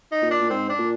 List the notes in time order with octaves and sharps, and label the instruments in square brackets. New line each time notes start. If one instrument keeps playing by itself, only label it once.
[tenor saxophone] D#4
[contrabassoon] A#2
[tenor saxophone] D4
[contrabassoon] A#2
[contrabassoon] G#2 [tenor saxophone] C4
[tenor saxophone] D4
[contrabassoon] A#2